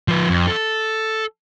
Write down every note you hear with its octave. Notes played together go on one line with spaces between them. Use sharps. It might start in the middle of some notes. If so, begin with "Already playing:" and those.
F3 B4
F2
A4